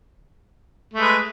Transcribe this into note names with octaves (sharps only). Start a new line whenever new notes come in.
G#3 A3 B4